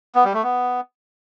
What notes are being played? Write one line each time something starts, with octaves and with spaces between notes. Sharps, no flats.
B3
G3
A3
B3